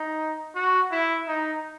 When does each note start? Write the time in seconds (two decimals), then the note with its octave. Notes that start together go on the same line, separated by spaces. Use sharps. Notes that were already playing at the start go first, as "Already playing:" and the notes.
Already playing: D#4
0.55 F#4
0.92 E4
1.27 D#4